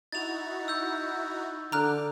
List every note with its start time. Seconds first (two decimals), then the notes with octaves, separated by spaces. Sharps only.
0.12 D#4 E4 F#4 A6 F7
0.68 E6 G6
1.72 D3 A#5 D6 F6 F#6